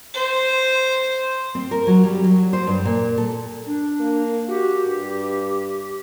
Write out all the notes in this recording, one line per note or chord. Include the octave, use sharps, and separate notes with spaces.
C5
C4
A#4
F#3
G3
F#3
C5
G2
A#2
A4
D4
A#3
F#4 G4
G2